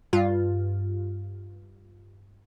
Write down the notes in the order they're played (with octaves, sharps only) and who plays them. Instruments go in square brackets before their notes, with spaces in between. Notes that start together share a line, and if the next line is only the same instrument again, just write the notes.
[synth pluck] G2 F4